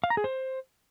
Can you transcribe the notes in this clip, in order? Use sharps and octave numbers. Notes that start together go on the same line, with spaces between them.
F5
A#5
G#4
C5